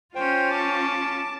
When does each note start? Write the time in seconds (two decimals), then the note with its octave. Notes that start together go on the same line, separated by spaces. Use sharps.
0.15 C#4 F4 C5 G5
0.51 A5 D6